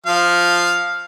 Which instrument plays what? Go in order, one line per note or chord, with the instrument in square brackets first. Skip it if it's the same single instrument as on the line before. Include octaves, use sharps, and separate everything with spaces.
[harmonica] F3 F5